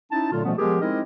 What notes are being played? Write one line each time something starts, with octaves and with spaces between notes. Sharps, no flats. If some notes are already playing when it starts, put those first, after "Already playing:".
C#4 D#4 E4 A5
A#2 D3 F#3 A3 F4
B2 F3 G3 A3 B3 C#4
F3 G#3 B3 G4 G#4 A#4
G#3 C4 D#4 E4 A#4 D#5